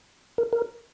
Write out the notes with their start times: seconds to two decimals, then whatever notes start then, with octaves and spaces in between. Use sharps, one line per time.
0.38 A#4
0.53 A#4